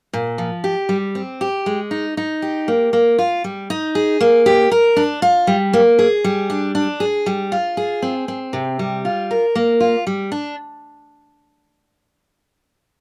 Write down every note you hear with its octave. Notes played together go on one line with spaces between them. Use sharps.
A#2
F3
G4
G3
C4
G4
G#3
D#4
D#4
G4
A#3
A#3
F4
G3
D#4
G#4
A#3
G4
A#4
D4
F4
G3
A#3
G#4
G3
D4
D4
G#4
G3
F4
G#4
C4
C4
C3
G3
F4
A#4
A#3
F4
G3
D4